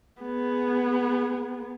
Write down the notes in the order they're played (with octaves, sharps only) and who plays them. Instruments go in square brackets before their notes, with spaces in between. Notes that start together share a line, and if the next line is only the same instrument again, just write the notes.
[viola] B3 G#4